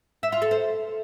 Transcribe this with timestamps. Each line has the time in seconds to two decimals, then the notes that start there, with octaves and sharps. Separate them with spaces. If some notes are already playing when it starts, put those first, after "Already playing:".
0.23 E5
0.32 F4
0.42 A4
0.51 C5